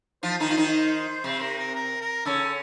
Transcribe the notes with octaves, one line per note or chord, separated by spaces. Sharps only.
F3 F4 C5
D#3 D#4
F4
D#3 D#4
C3 C4 C5
A#4
A#4
A#4
A#4
C#3 C#4 A4